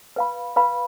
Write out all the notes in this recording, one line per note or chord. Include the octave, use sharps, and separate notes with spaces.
B4 F5 B5
B4 F5 B5